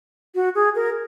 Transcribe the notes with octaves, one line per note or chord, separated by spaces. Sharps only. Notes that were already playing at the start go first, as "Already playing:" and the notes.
F#4
G#4
A#4